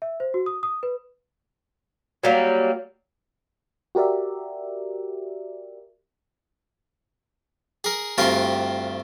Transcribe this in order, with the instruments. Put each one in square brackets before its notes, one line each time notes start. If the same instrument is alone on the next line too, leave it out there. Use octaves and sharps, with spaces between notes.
[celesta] E5
C5
F#4
D#6
D#6
B4
[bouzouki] F#3 G3 A#3
[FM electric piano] F#4 G4 A#4 D5 E5
[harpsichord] G#4 A#4
D2 G2 C4 F4 A#4 G#5